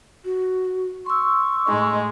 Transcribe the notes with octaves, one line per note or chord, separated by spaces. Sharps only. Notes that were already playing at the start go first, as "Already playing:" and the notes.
F#4
C6 C#6 E6
A2 G#3 D#4